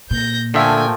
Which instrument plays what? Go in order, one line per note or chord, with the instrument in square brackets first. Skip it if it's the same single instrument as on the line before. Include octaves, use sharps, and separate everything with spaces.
[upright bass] A#2 [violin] G6 A#6
[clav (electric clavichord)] D3 E5 [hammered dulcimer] F3 A3 A#4 [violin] G5 G#5